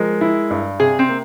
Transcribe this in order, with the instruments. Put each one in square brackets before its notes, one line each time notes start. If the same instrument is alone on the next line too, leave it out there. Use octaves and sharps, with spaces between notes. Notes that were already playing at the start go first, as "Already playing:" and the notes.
Already playing: [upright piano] F3 G#3 [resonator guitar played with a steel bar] A#4
[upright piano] E4
G2
[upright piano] C3 [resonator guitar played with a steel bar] G#4
[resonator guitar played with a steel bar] C4
[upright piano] A#3